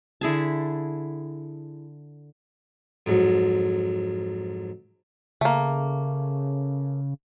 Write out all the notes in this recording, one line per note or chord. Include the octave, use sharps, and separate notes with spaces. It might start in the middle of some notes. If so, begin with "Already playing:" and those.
D3 E4 G#4 A5
F2 G#2 F#3
C#3 A3 A#3